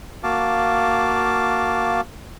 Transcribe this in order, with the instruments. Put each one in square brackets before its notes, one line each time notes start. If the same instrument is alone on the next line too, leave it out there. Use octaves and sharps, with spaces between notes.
[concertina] A#3 F#4 F5 A5 D6